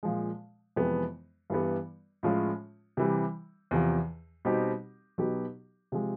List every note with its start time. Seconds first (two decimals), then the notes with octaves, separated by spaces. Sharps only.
0.03 A#2 F3 G#3
0.76 F2 C3 E3 G#3 B3
1.50 G2 E3 G3 B3
2.23 A2 F3 G#3 C#4 F4
2.97 C3 E3 G3
3.71 E2 C3 F3
4.45 B2 G3 C4 D#4 G4
5.18 B2 F#3 B3 D#4 G4
5.92 C3 F3 G#3